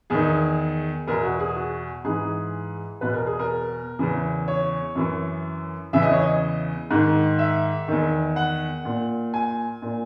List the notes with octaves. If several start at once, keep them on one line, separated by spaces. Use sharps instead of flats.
E2 D#3 G#4
E2 B2 A#4
F#4
G#4
F#4
G#2 E3 G#4
E2 B2 B4
A#4
G#4
A#4
E2 C#3 E3
C#5
F#2 E3
E2 C#3 E3 E5
D#5
C#5
D#5
G#2 D#3
E5
E2 D#3
F#5
A#2
G#5
A#2